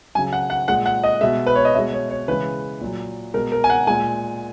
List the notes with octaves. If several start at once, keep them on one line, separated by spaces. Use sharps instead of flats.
C#3 F#3 G#5
F#5
F#5
A#2 G#3 F#5
F#5
D#5
B2 G#3 E5
B4
C#5
D#5
B2 G#3 E5
C#5
C#5
C#3 E3 G#3 B4
A#2 F#3
B2 G#3 A#4
A#4
G#5
F#5
A#2 G#3 G#5